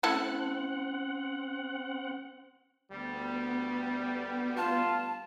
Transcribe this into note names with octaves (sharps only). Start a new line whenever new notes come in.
A3 C4 C#4 E4 A4 F#5
D2 G3 B3
F4 A5